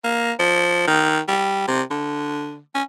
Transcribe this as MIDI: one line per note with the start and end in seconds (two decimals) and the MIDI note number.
0.04 0.32 58
0.39 0.84 53
0.87 1.20 51
1.28 1.65 55
1.67 1.82 48
1.90 2.59 50
2.75 2.83 61